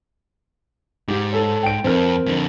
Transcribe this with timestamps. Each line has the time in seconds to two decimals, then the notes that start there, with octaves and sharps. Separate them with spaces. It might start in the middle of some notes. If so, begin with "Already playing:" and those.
1.08 G#2 G4
1.32 A4 C#5
1.63 G5 D7
1.84 F2 C4 A#4
2.27 F2 D3